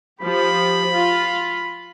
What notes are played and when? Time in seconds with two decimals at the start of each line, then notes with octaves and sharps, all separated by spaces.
0.21 F3 G4 B5
0.92 F4